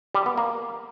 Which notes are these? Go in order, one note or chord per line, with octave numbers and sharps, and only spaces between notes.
G3
B3
A#3